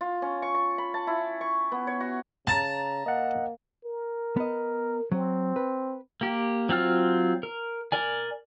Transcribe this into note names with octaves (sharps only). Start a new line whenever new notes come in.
F4
C#4
C#6
C#6
B5
A5
E4
C#6
B3
C#5
F#4
C#3 A5 A#5 A6
A#3 D#5 F#5
A#4
B3 D#5
F#3 C4
B4
A#3 G4
F#3 C4 F4 F6
A#4
A#4 D5 G#5